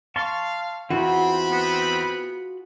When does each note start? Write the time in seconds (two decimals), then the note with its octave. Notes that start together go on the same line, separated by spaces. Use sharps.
0.16 F5 A5 C6 C#6
0.90 E2 C4 F4 F#4 G#4 F#5 B5
1.52 B3